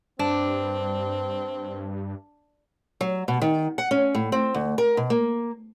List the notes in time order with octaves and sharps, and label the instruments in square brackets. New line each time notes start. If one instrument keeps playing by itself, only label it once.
[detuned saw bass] G2 [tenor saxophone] C4 [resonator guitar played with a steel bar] D4
[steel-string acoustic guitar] F#3
B2
D#3
F#5
C#4
A2
C4
D2
A#4
B2
A#3